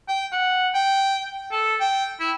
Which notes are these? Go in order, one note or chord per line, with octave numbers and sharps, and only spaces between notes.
G5
F#5
G5
A4
G5
E4